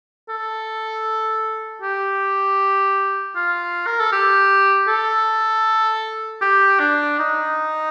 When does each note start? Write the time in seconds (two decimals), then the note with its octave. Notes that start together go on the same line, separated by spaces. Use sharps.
0.29 A4
1.82 G4
3.36 F4
3.87 A#4
4.00 A4
4.12 G4
4.88 A4
6.42 G4
6.79 D4
7.19 D#4